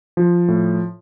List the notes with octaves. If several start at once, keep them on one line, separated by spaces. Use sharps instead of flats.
F3
A2